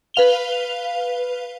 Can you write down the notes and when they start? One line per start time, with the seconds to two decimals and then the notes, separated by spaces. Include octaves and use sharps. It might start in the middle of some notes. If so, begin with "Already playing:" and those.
0.14 B4 F5 F7 G7